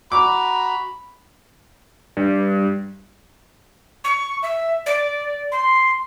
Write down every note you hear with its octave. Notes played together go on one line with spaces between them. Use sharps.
F#4 A#5 B5 D6
G2
C#6
E5
D5
C6